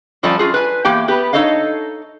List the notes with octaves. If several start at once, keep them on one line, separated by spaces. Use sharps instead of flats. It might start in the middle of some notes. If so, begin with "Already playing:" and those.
F#2 F3 G3 A4 D5 G#5
F#2 F4 G#4
B4 G#5
E2 A#3 G4 G5
B3 G4 B4
D#4 E4 A4 C#5 D#5 F5